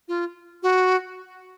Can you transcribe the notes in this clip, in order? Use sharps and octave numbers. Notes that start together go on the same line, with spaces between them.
F4
F#4